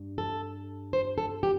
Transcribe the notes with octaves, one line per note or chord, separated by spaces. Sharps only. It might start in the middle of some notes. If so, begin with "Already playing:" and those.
Already playing: G2
A4
C5
A4
G4